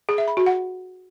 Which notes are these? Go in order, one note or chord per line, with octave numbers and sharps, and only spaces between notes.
G#4
E5
B5
F#4
F#5